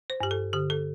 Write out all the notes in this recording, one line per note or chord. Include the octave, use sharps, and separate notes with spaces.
C5
G2 G4
A4
D3 G4
A4